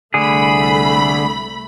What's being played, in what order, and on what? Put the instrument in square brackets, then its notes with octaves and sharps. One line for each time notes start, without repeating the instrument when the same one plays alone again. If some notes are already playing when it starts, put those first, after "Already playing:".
[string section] C2 A3 B5 [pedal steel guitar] D3 G#4